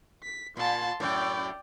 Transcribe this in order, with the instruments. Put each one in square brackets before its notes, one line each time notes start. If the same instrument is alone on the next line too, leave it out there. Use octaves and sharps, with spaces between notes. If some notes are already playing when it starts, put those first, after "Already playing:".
[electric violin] B6
[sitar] A#2 [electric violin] A5 C6
[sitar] F#2 A2 [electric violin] D5 G5